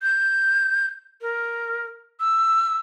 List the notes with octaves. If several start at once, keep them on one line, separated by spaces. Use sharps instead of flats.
G6
A#4
E6